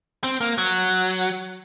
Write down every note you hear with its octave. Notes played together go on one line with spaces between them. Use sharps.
C4
A#3
F#3